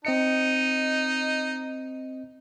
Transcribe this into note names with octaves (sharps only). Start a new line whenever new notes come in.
C4 D#4 D#5 C#7